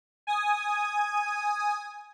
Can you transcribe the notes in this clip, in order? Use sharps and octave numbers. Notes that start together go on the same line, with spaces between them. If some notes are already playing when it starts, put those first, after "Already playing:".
G#5 D#6